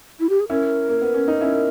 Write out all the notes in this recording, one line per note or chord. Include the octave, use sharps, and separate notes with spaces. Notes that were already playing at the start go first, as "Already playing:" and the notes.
E4
G4
G#4
C#4 E4 A#4
A#3
B3
C#4
D#4
C#4 E4